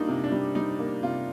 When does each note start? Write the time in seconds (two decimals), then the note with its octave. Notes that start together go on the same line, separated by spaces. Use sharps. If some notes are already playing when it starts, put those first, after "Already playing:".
Already playing: G3 A#3 D4 D#4 F4
0.08 C3
0.24 D4
0.32 G3
0.55 G3 D#4
0.79 A#3
1.03 C3 F4